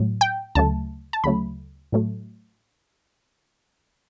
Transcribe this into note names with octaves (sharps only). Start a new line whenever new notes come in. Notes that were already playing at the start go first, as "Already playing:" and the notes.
Already playing: A2 F#3
G5
D2 C#3 F#3 A3 A5
A5
D2 C#3 F#3 A3 B5
A2 F#3 A3